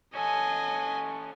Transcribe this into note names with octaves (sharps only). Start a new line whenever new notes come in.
C#4 A4 D#5 G#5